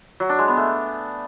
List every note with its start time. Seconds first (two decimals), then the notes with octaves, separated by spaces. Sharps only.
0.20 F#3
0.29 D4
0.39 G#3
0.48 B3
0.57 A3